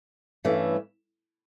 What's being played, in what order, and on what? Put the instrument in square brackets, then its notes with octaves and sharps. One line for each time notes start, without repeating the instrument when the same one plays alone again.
[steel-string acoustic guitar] G2 E3 A3 C#4